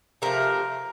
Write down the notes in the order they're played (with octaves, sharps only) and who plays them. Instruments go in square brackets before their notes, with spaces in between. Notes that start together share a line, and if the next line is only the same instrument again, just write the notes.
[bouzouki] C3 F3 A3 A#4